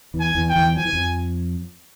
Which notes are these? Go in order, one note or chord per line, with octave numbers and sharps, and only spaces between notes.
E2 E3
G#5
E2 E3
G5
E2 E3
F3 G#5
E3
F2 F3